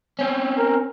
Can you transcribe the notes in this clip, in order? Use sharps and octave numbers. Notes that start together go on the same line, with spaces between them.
C4 C#4
A#4